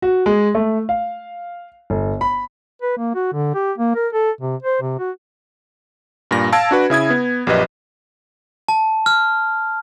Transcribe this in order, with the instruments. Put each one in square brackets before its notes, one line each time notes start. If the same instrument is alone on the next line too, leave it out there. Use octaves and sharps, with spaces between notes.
[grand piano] F#4
G#3
A3
F5
G1
B5
[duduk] B4
A#3
F#4
D3
G4
A#3
A#4
A4
C3
C5
C3
F#4
[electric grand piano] G2 A#2 A#6
F5 A5 E6 G#6 D7
D4 F#4 B4
C#3 E4 D#6 G#6
B3
A#1 F#2 G4 B4 D#5
[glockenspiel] A5
F6